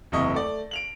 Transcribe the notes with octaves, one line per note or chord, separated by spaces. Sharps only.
F#1 E2 C3 E4 D#5 C#6
A3 D5
D7 F7 F#7